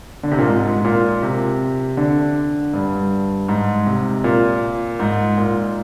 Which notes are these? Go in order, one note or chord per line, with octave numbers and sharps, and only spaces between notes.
D3
C3
A#2
G#2
A#2
C3
D3
G2
G#2
C3
A#2
G#2
A#2